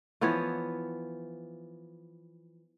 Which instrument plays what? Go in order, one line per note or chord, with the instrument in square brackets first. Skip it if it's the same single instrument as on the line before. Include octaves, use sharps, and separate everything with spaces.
[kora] E3 F3 B3 C#5